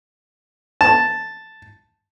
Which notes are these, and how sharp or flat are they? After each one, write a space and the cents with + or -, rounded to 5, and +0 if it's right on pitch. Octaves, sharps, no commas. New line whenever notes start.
A5 +0